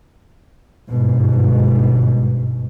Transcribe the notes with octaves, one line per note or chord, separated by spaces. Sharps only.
G1 G#2 B2